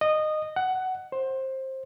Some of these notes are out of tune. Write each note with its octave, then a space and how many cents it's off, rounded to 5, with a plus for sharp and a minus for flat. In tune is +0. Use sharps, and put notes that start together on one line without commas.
D#5 -15
F#5 +15
C5 +20